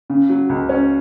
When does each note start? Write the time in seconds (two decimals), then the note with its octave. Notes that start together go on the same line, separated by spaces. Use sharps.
0.10 C#3
0.29 F#3
0.49 C#2
0.69 C#4